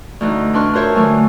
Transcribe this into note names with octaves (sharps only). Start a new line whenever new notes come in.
D2 E3 D#4
A2 D4 B4 C6 C#6 F6
F4 F#4 A#4 C5 C#5 E5
D3 E3 F#3 A3 G#5